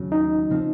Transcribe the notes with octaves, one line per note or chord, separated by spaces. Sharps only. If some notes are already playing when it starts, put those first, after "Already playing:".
Already playing: D#2 C#3 F#3
D#4
C#3 F3 C4